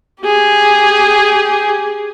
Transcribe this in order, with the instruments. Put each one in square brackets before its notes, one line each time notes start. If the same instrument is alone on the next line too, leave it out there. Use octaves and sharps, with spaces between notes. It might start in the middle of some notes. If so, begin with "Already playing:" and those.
[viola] G4 G#4